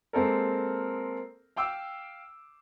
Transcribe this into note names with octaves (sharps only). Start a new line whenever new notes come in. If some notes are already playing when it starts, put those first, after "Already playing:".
G#3 A#3 C4 A4 A#4
F5 G5 D6 E6